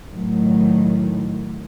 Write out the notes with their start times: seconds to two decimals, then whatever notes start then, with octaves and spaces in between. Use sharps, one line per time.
0.10 A2 D#3 F#3